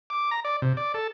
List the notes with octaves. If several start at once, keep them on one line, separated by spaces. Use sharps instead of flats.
D6
A#5
D5
C3
D5
A4